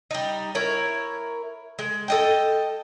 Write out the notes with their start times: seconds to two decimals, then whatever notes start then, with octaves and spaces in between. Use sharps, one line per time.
0.11 G3 D#4
0.55 E4 A#4 C#5
1.79 G#3
2.08 A4 D#5 G5